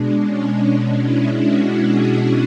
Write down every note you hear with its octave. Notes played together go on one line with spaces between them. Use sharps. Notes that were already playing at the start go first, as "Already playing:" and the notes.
Already playing: B2 G#3 D4
C#4
D4
E4
F#4
G#4